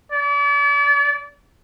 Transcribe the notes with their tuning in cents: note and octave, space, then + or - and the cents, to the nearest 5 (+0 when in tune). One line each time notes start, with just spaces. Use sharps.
D5 -40